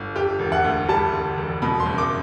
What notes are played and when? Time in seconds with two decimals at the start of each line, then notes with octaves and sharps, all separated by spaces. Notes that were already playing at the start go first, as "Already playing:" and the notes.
Already playing: G1
0.15 D3 G4
0.39 E1
0.52 F#5
0.64 D2
0.89 G3 A5
1.13 D3
1.38 E1
1.62 B2 B5
1.80 C6
1.86 F#1
1.98 D6